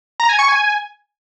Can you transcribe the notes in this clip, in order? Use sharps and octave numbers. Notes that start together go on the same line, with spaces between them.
A#5
G#5
C#6
G#5